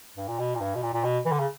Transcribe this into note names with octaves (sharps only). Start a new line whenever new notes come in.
G2
A#2
B2
A#2
G2
B2
A#2
A#2
B2
E3
D3
C#3